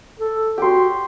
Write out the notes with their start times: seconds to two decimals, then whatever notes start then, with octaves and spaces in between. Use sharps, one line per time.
0.20 A4
0.58 F#4 G4 C6